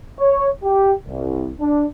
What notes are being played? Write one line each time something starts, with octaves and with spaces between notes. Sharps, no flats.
C#5
G4
C2
D4